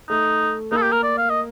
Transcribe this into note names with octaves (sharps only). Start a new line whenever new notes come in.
A3 D#4
A#3 D#4
A4
G4
A#4
D5
F5
D#5